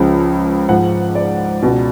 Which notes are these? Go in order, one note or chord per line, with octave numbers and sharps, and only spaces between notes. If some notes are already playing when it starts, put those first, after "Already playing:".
Already playing: C#2 C#3 F3
G#2 F3 F#5
D5
C#2 B2